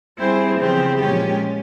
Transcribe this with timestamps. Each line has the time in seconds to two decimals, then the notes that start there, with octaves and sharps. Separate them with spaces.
0.17 G3 C4 E4 G#4 C5
0.58 E2 C#3 F3 C4 G4
1.00 A#2 F3 G#3 C#4 G4